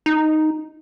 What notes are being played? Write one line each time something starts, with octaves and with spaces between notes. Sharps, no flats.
D#4